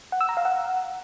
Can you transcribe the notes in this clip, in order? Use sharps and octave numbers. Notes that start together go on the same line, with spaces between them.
F#5
E6
A#5
F5
F#5